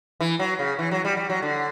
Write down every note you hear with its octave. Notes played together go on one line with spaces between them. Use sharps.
E3
F#3
C#3
E3
F#3
G3
G3
F#3
D3